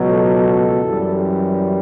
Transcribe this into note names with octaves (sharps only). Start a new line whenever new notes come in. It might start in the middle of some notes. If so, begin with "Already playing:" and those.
Already playing: C#2 B2 F#3
A4
F#2 E3 G3